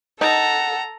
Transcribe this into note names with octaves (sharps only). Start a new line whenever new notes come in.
D#4 A4 F#5 A#5